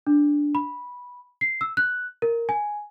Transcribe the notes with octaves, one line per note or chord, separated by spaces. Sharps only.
D4
B5
C7
E6
F#6
A#4
G#5